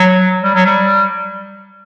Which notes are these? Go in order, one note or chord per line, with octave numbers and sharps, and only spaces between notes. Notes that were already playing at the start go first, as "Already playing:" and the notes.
Already playing: F#3
G3
F#3
G3